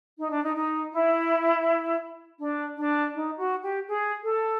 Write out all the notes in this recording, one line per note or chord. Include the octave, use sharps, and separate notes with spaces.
D#4
D4
D#4
D#4
E4
D4
D4
D#4
F#4
G4
G#4
A4